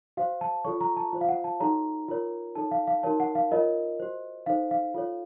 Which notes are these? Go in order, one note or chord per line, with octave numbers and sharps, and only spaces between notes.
F#4 C5 F5
A5
F4 A4 C#5 C#6
A#5
A5
F4 C5
F5
F#5
A5
D#4 F#4 A4 C#5 A#5
F4 A#4 C#5
D#4 A4 C#5 A5
F5
F5
D#4 F#4 A#4 C#5 A5
F#5
F5
F4 A#4 C#5 D#5
F#4 C5
D#4 A4 C5 F5
F5
F4 A4 C#5